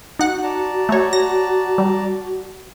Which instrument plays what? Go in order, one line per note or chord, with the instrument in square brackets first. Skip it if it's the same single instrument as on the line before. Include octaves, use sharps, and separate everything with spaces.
[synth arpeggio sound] D#4 F#5 [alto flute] F#4
[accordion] D5 A5 A#5
[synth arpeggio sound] A3 C#5
A#6
G3